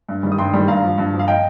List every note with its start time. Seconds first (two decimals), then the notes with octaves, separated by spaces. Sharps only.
0.09 G2
0.23 D#3 G3
0.32 D#6
0.38 G2 G5 C6
0.53 D#3 G3
0.68 G2 F5 A#5
0.83 F3
0.98 G2
1.13 F3
1.19 F5
1.28 D#5 G5